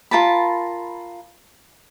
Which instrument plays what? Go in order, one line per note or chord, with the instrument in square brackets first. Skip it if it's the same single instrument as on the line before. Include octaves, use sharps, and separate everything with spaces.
[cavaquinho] F4 A#4 A5 B5